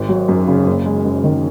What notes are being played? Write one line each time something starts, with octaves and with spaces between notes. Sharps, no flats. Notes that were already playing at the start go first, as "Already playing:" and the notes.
Already playing: G#1
F#3
F#2
C#3
F#1
G#3
F#2
D#3